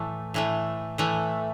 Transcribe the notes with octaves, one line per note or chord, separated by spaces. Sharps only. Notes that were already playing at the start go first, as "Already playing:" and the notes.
Already playing: A2 E3 A3
A2 E3 A3
A2 E3 A3